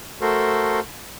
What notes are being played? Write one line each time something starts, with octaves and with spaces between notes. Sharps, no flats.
A3 F#4 A4 A#4 C5